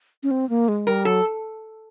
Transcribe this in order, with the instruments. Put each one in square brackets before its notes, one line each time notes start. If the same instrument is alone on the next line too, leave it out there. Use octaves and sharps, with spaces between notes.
[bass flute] C#4
C4
A#3
G#3
[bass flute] G3 [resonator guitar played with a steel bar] A#4
[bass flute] F#3 [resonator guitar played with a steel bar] A4